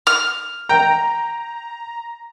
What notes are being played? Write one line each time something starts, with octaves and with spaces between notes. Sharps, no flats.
F6
G5 A#5